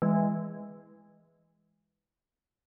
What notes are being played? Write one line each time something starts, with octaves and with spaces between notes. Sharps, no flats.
E3 G#3